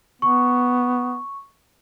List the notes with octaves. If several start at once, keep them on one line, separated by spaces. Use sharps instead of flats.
B3 C#6